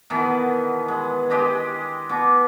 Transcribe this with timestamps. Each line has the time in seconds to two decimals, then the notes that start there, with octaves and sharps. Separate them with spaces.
0.10 B2 D#3 E3 B3
0.88 G#3
1.30 G#3 G4 D#5 C6
2.09 B2 D6